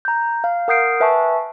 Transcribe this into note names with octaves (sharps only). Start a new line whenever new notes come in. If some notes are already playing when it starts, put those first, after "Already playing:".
A#5 G6
F5
A#4 F#5 D#6 G6 C7 D7
B4 E5 G#5 A5 C#6